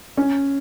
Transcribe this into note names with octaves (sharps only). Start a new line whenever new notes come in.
C#4